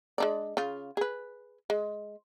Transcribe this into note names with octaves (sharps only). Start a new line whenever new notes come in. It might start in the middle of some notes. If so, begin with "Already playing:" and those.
G#3 D4 D5
C#3 F4
G#4 B4
G#3